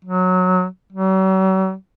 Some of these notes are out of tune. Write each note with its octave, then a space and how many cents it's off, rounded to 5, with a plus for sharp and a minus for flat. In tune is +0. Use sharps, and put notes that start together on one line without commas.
F#3 -10
F#3 +45